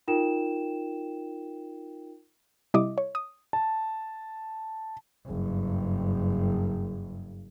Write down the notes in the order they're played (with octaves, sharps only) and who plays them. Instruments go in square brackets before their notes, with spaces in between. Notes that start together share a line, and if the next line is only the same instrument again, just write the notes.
[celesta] D#4 F4 A#4 G5 E7
[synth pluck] C3 G3 E4 D#5 D6
C#5
D#6
[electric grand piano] A5
[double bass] F#1 G2